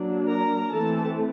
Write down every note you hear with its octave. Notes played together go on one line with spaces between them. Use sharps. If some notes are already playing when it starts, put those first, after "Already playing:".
Already playing: F#3 A#3 D4
A#4 A#5
E3 A3 C4 A4 A5